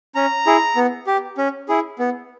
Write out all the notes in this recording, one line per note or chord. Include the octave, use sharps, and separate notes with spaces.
C#4 A#5
E4 G#4
B3
G4
C#4
E4 G#4
B3